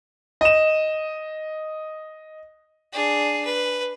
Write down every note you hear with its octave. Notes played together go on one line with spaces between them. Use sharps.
D#5 E7
D4 G#4
B4